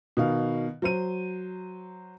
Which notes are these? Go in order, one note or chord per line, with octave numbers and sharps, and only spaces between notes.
B2 D#3 F5
F#3 C5 D#7